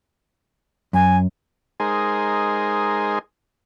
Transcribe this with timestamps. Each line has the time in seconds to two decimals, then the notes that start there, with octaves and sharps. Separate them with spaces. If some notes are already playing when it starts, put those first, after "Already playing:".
0.93 F#2 G#5
1.80 G#3 D#4 G#4 A#4 C5